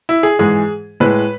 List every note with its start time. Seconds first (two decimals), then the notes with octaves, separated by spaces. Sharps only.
0.09 E4
0.23 G#4
0.39 G#2 E3 G#3 G#4
1.00 A2 G#3 B4